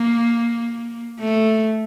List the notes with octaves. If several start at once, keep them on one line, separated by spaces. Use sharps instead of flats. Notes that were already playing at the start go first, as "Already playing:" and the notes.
Already playing: A#3
A3